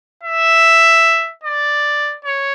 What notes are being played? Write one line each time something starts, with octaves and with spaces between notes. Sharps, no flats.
E5
D5
C#5